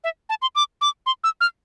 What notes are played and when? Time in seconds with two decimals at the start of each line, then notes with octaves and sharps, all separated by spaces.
0.04 E5
0.29 A5
0.42 C6
0.55 D6
0.81 D6
1.06 C6
1.24 E6
1.41 F6